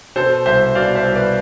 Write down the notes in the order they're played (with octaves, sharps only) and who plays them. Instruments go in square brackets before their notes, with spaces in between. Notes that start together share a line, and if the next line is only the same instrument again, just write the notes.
[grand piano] B2 A4 C5
C2 C5 E5
B2 D5 F5
C5 E5
C2
B4 D5